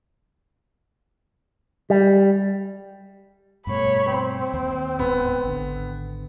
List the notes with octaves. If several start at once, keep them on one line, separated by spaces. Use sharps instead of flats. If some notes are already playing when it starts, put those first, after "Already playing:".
G3
G2 B2 A3 C#5 B5
C4 C5 C6
D#2
D1 G#2 B3
G#1 D3